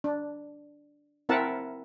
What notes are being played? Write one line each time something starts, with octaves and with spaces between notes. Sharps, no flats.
D4
C4 E4 A#4 E5 F#5 A5